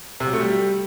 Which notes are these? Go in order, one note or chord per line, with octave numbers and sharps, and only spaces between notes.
C3
F#3
A3
G3